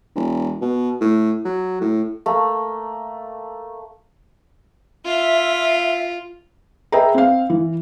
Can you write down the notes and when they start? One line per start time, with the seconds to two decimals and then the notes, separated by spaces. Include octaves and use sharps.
0.15 E1
0.61 B2
1.01 A2
1.45 F#3
1.81 A2
2.26 A3 A#3
5.06 F4 E5
6.92 G#4 B4 D#5 E5 G5 A#5
7.14 C4 F5
7.50 E3